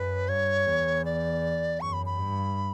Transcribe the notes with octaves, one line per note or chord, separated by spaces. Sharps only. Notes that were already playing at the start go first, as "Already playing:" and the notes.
Already playing: F#2 B4
G2 C#5
E2
D5
F#2 C#6
B5
B5
G2